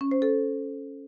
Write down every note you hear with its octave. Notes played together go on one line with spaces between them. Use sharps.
C#4
C5
A4